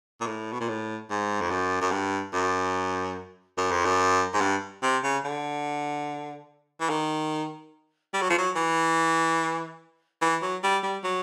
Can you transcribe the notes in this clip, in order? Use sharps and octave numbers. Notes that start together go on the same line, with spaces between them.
A#2
A2
B2
A#2
A2
G#2
F2
F#2
F#2
G2
F#2
F#2
F2
F#2
G#2
G2
C3
C#3
D3
E3
D#3
G3
F#3
F3
F#3
E3
E3
F#3
G3
G3
F#3